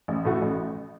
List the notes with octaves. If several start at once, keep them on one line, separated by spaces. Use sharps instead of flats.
A1
A2 A3 F#4
A1